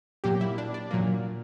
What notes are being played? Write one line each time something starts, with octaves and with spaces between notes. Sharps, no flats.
A#2 F#3 A#3 G4
E4
D4
D4
A#2 F#3 A#3